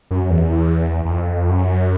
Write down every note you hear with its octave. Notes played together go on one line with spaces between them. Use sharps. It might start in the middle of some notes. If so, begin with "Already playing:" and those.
F#2
E2
E2
F2
F#2